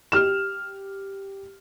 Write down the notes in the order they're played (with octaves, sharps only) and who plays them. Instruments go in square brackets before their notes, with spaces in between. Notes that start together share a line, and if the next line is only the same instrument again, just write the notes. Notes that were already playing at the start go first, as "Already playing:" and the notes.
[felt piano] G4 F6 E7